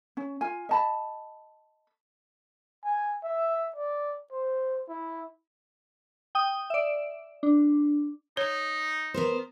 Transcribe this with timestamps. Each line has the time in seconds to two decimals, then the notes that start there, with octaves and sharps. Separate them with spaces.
0.17 C#4
0.41 F4 G#5
0.69 D#5 A5 B5
2.84 G#5
3.24 E5
3.76 D5
4.32 C5
4.89 E4
6.35 G5 D#6
6.70 D5 E5
7.43 D4
8.37 D#4 C#5
9.14 B3 A#4 C5